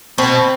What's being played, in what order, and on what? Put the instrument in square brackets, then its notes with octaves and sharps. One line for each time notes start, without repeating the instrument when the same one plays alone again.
[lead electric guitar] B2 [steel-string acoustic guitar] C4